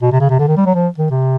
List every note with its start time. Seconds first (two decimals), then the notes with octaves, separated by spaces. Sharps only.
0.02 B2
0.12 C3
0.20 C#3
0.29 C3
0.39 D3
0.47 D#3
0.57 G3
0.66 F#3
0.75 F3
0.98 D#3
1.11 C3